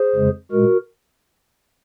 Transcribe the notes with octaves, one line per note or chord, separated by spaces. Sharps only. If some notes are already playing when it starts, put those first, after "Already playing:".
Already playing: G#4 C5
F2 C#3 G#3
A#2 G#3 F#4 A#4